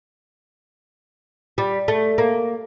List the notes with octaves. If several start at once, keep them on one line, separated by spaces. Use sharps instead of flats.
G3
A3
A#3